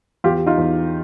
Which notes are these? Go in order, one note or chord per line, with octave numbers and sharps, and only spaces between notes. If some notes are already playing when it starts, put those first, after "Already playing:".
E2 F4 G4
D#4 F4
E2